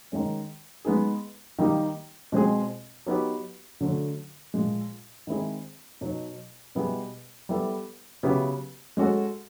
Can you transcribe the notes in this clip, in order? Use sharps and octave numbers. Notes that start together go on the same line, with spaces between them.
D#3 G#3 C#4
G#3 B3 D#4 G#4
D#3 G3 A#3 D#4 G4
B2 G#3 C4 F4 G#4
F#3 B3 D#4 G4
D3 F#3 A3
A#2 F3 G#3
D#3 G#3 C4 E4 G#4
B2 F#3 B3 D#4
B2 G3 B3 E4 G#4
G3 B3 E4 A4
C#3 F#3 B3 E4 G4
G#3 C#4 F#4 A4